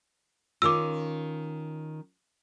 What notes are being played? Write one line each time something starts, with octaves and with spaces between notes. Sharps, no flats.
D#3 C#4 F4 D6 E6